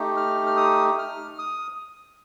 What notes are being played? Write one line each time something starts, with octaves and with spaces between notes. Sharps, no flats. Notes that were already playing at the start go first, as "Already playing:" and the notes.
Already playing: A3 D#4 G4
F6
F6
D#6
F6
D#6